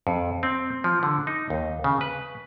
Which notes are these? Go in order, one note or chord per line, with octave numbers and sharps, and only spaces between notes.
F2
C4
F3
D3
D#4
D#2
C#3
B4